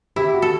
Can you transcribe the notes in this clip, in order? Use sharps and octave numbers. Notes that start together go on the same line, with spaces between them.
E4 G4
F#4
A4